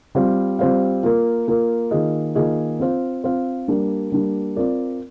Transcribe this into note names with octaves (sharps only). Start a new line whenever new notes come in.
G3 C4 F4 C5 F5
G3 C4 F4 C5 F5
A#3 F4 A#4
A#3 F4 A#4
D#3 A#3 F4 G#4 D#5
D#3 A#3 F4 G#4 D#5
C4 F4 C5 F5
C4 F4 C5 F5
G3 A#3 D4
G3 A#3 D4
C4 F4 A#4 D5